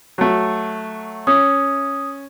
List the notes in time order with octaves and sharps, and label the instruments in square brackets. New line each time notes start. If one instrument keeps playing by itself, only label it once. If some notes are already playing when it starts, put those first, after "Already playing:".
[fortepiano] F#3 A3
[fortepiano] C#4 [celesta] D#6